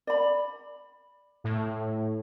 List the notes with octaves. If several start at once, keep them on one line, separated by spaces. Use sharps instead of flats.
D5 B5
A2